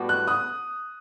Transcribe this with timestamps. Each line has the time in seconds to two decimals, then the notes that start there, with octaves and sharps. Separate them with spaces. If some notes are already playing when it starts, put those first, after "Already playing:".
Already playing: A2 G3 B3 F#4
0.09 F#6
0.28 D#6 F#6